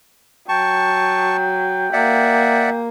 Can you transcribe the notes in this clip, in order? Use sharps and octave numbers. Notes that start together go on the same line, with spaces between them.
F#3 G5 A5 C#6
A#3 D5 E5 F#5